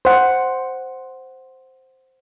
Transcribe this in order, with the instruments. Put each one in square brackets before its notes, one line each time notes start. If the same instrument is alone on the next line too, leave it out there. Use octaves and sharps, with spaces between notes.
[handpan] C5 F#5